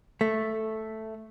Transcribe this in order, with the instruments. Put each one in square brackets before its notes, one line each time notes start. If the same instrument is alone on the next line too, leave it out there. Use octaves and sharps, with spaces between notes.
[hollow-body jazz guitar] A3